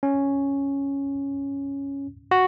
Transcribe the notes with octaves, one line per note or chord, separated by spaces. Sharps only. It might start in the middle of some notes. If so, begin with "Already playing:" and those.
C#4
F#4